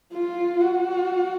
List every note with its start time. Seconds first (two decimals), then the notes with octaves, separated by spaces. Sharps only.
0.13 F4
0.60 F#4